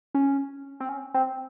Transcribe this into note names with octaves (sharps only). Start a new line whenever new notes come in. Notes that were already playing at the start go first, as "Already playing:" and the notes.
C#4
C4
C#4
C4